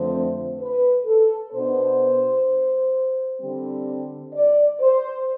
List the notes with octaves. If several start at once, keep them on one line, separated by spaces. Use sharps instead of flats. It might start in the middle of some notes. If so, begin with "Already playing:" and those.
Already playing: F2 D3 F3 A3 C4 C5
B4
A4
B2 B3 D4 C5
D3 G3 C4
D5
C5